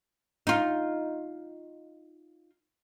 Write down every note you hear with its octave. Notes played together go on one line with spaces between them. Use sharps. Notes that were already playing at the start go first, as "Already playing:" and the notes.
D#4 F4